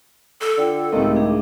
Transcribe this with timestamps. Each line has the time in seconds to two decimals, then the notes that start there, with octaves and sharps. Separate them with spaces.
0.41 A4
0.58 D3 F4 G5
0.92 C#2 A2 D#3 C4 G4
1.16 D4 G#4